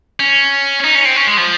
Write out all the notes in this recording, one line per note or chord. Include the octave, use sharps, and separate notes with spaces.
C#4
D#4
C#4
C4
C#4
G#3
F3